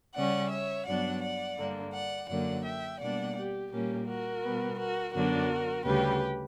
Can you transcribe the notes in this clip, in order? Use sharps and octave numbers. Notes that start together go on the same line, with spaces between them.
C#3 G3 C#4 D5 F#5
C#5 E5
G2 F#3 B3 D4 D5 F#5
D5 F#5
G2 D3 A#3 D4
D5 F#5
F#2 D3 F#3 A#3 D5 F#5
E5 G5
B2 G3 A#3 D4 D5 F#5
G4
A#2 G3 A#3 C#4 G4
F#4 A#4
B2 G3 B3
F#4 A#4
F#2 D3 F#3 B3 D4 F#4 A#4
D2 C#3 G3 G4 B4